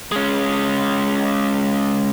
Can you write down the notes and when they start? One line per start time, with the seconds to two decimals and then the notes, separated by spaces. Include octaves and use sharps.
0.12 G#3 C#4